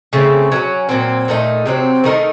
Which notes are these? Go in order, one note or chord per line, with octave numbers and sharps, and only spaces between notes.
C#3 A3 C4
F#3 A3 C#4
A#2 F#3 C4
A#2 A3 D#4
C3 F#3 C4
D#3 A3 D#4 A#4